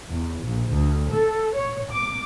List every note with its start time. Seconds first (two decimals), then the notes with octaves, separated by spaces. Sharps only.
0.11 E2
0.43 A#1
0.75 D2
1.12 A4
1.55 C#5
1.91 D6